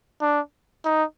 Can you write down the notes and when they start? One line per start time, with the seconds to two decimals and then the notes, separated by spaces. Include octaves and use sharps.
0.22 D4
0.85 D#4